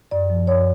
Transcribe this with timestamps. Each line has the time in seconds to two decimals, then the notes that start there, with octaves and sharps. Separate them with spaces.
0.11 F#2 D5
0.30 F3
0.47 F#2 C#5